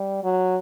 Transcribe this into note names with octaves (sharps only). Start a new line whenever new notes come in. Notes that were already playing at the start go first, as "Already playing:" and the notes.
Already playing: G3
F#3